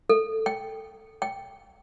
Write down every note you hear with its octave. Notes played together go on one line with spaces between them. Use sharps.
A4
G5
G5